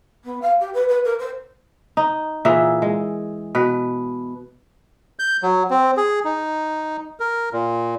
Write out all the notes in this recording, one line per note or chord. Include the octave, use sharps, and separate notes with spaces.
B3
F5
G4
B4
B4
A#4
C5
D#4
A#2 E3 G#4 E5
G#3
B2 B4
G6
F#3
C4
G#4
D#4
A#4
A#2